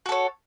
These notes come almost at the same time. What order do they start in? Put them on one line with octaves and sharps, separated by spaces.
F#4 A4 C#5